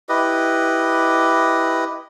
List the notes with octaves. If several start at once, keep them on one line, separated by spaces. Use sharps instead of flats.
E4 G4 B4 D#5